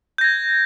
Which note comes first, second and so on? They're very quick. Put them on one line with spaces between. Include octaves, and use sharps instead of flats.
G6 A#6 G#6